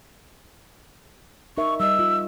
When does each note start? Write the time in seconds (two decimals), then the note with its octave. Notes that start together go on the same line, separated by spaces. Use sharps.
1.58 D#4 A#4 E5 C#6
1.80 G3 D#5 E6
1.99 F4